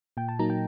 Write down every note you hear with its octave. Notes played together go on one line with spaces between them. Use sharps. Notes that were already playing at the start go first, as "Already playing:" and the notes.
A#2 G5
A5
F#3 A#3 D#4 A#5
G5